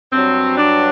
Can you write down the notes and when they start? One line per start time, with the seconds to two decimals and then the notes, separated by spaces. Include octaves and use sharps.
0.12 G2 F#3 C4
0.57 D4